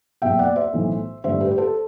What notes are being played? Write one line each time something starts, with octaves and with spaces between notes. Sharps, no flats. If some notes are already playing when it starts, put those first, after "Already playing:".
F#1 E2 B2 E5 G5
D5 F#5
C5 E5
B1 A2 E3
A1 G2 D3 C5 E5
G4 B4
B4
A4 C5